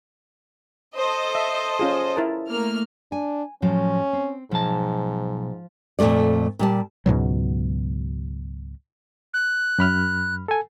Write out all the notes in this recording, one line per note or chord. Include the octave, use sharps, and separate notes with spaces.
A4 C5 D#5
E5
C#4 F4 G#4
E4 A#4 A5
A3 A#3 F6
D4 G#5
A2 F3 F#3 C#4
C4
B1 G#2 F3 A5
F2 A#2 D#3 A3 D5
A#2 G3 A5
C#2 G#2 B2 F#3
F#6
F#2 B5 F6
A4 G#5